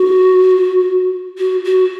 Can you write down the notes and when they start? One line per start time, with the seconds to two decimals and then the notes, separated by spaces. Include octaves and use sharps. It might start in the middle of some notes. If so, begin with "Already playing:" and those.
Already playing: F#4
1.38 F#4
1.65 F#4